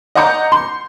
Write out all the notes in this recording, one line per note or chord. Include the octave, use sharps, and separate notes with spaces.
D#5 F#5 A#5 D6 G6 C#7
C6